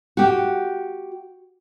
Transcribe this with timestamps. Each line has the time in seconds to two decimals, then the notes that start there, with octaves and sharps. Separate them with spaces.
0.17 F#4 G4